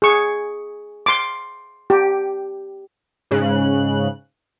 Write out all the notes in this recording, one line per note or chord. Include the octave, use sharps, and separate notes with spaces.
G#4 C#6
C6 D6
G4
G#2 C#3 F#6